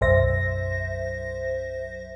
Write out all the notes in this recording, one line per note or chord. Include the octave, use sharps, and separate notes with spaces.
B1 F#2 C5 E5 A#6